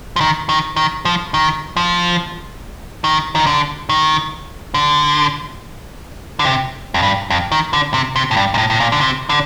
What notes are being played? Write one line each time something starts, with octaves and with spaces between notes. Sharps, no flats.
F3
D#3
D#3
D#3
F3
D#3
F3
D#3
D#3
D3
D#3
D3
D3
C3
F2
G2
F2
D#3
D3
C3
C3
A2
G2
A#2
A2
A2
A#2
D3
C3
D3